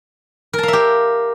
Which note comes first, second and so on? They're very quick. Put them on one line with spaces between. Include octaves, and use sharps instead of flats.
A#4 A5 F5 E5 G4